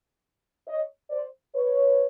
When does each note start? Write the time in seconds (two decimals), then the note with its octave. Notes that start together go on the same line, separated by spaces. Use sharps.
0.67 C#5 D#5
1.10 C5 D5
1.55 B4 C#5